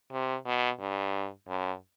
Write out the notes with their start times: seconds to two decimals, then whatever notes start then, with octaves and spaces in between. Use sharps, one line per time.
0.12 C3
0.46 B2
0.80 G2
1.48 F#2